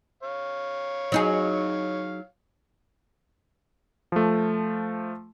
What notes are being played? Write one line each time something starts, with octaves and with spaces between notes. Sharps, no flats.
C#5 F5
F#3 D#4 G#4
F3 A3